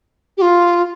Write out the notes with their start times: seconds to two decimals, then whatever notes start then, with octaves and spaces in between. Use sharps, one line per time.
0.38 G4
0.42 F4